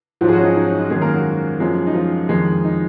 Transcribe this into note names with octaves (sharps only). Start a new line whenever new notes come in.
G#2 F3 F#3 F4
G#4
F#3 F#4
C#4
D#4
D#4
C#4
D#4
F#2 D#3 G#3 G#4
A#3 A#4
F#3 F#4
F#2 F3 G#3
D#4
F3 F4
F2 D#3 G#3
D#4